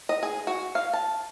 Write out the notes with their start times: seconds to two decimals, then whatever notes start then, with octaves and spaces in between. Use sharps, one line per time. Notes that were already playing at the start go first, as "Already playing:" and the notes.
0.09 D#5
0.23 G#4
0.47 F#4
0.75 F5
0.93 A5